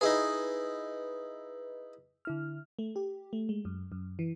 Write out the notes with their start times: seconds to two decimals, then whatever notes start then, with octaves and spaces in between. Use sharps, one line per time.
0.01 D#4 E4 G#4 B4 D#5
2.25 D3 E4 F6
2.79 A3
2.96 G4
3.33 A3
3.49 G#3
3.65 F#2
3.92 F#2
4.19 E3